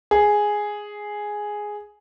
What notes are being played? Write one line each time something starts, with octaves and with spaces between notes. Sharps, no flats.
G#4